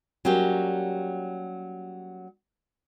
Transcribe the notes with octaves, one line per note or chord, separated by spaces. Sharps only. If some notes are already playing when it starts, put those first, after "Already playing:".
F#3 G3 A#3 C#4 G4